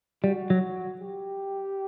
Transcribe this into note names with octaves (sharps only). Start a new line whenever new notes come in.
G3 F#4
F#3
G4